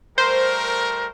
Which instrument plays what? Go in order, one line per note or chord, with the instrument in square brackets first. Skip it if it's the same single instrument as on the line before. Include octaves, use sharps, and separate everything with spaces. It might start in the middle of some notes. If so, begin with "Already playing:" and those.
[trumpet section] G3 A3 A#4 [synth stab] C5